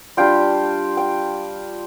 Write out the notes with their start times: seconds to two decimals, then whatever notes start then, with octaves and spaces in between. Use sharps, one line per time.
0.17 G3 D4 F4 G5
0.97 G5